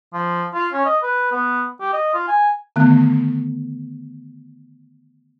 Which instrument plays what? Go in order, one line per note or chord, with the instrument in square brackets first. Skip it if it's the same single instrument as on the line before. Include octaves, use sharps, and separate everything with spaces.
[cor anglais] F3
F4
C#4
D#5
B4
B3
G4
D#5
F4
G#5
[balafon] D3 D#3 A3 B3